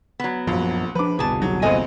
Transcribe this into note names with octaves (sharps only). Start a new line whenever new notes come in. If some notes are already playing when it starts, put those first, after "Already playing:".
F#3 B3
A#1 F#2 F3
F3 D4 B4 D6
G1 C2 B2 G#4 A5
F#3
A#1 G#3 C4 A4 D#5 G#5